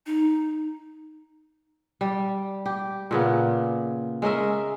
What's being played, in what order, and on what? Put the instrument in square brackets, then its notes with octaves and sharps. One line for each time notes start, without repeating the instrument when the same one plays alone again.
[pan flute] D#4
[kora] G3
G4
A#2 C#3 B3
G#3 C#4 A#4 E5